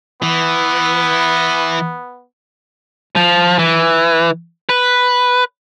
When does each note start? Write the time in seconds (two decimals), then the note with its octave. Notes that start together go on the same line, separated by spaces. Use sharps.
0.22 E3 B3
3.16 F3
3.59 E3
4.69 B4